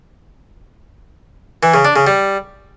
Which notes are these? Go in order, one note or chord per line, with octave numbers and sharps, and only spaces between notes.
E3
C#3
D4
C#3
G3